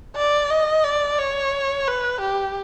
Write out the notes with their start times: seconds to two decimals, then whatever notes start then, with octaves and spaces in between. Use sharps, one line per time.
0.16 D5
0.50 D#5
0.84 D5
1.19 C#5
1.87 B4
2.21 G4